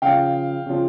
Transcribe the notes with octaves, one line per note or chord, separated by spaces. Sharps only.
C#3 F3 F5 G5
C#3 F3